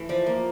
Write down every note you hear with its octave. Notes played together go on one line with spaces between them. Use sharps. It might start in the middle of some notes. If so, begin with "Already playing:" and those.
Already playing: E3 A3
F3 D5
A#3